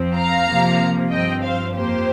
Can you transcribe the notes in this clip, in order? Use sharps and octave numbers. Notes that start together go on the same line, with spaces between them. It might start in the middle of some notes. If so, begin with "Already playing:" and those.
Already playing: F2 F3 C4
F5 A#5
C3 F3 A#3
G2 F3 C4 D#5 G5
C5 F5
F2 F3 A#3 G4 C5